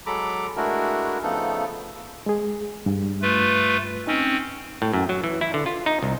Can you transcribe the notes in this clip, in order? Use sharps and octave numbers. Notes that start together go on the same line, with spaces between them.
F#3 G#3 A4 A#5 B5 D6
G#3 A3 D4 E4 F#4 A#4
C#3 F3 A3 B3 D#4 A4
G#3 G#4
G2
A3 F4 B4
C4 C#4 D#4
A2
F#2
F#3
E3
E4
D3
F4
D#4
C2